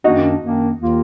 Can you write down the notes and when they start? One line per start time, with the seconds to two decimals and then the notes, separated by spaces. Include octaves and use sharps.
0.04 F#2 D#3 A#3 D4 D#4 F#4
0.41 F#2 D#3 A#3 D4
0.77 D#2 D#3 A#3 F4